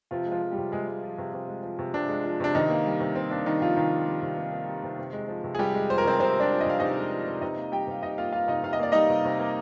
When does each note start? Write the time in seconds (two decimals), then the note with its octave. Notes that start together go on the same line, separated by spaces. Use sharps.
0.11 C3 F3 F4
0.26 G#3
0.32 F3 F4
0.42 F3
0.51 G3 G4
0.58 C3
0.72 C3 G#3 G#4
0.88 G#3
1.03 F3
1.18 C3
1.34 C3
1.48 G#3
1.63 F3
1.79 C3
1.94 C3 D4
2.09 G#3
2.24 F3
2.40 C3 D4
2.55 C3 D#3 D#4
2.70 A#3
2.86 G3
3.00 C3
3.15 C3 C4
3.30 A#3 D4
3.46 D#3 G3 D#4
3.61 C3 F3 F4
3.76 C3 D#3 D#4
3.92 A#3
4.07 G3
4.22 C3
4.38 C3
4.52 A#3
4.68 G3
4.84 C3
4.98 C3
5.13 G#3
5.28 F3
5.44 C3
5.55 G#4
5.59 C3 G3 G4
5.74 G#3
5.89 F3 C5
5.98 A#4
6.04 C3 C4 C5
6.20 C3 C4 C5
6.36 G#3 D4 D5
6.50 F3
6.60 D#5
6.66 C3 F5
6.79 C3 D#4 D#5
6.97 G#3
7.11 F3
7.27 C3
7.41 C3 D#4 D#5
7.56 A#3
7.72 G3 G4 G5
7.87 C3 F5
8.02 C3 D#4 D#5
8.18 A#3 F4 F5
8.32 G3 F4 F5
8.48 C3 D#4 D#5
8.63 C3 F5
8.73 D#5
8.79 A#3 D5
8.92 G3 D#4 D#5
9.09 C3
9.25 C3
9.40 A#3